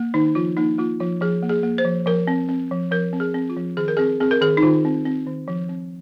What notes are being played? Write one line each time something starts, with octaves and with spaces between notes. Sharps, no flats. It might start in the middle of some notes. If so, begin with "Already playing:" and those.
Already playing: A#3
D#3 D#4
F3 F4
A#3 D#4
A#3 F4
F3 F4
F3 G#4
A#3
G#4
A#3
C5
F3
F3 A#4
C4
C4
F3
F3 A#4
C4
G#4
C4
F4
F3
D#3 G#4
A#4
C4 G#4
C4 G#4
A#4
D#3 G#4
D#4
D#3 F4
C4
C4
D#3
F3
C4